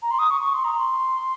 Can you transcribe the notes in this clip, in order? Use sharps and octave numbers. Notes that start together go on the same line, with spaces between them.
A#5
C6
D#6
C#6
C#6
C6
A#5
C6